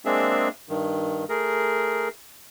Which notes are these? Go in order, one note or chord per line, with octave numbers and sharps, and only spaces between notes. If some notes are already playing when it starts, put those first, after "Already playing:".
G#3 A#3 C4 D4 G#4 E5
G2 D#3
A3 G#4 A#4